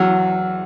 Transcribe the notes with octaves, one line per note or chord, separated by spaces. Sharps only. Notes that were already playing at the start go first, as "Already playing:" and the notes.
Already playing: E2 F#3